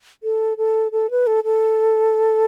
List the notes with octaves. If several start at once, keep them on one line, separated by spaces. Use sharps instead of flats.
A4
A4
A4
B4
A4
A4